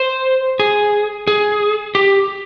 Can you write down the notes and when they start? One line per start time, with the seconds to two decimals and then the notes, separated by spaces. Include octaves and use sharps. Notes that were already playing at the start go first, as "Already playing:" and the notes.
Already playing: C5
0.60 G#4
1.27 G#4
1.95 G4